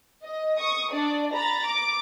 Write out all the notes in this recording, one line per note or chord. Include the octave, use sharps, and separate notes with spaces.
D#5
C#6 D#6
D4 D5
A#5 B5 A6
D6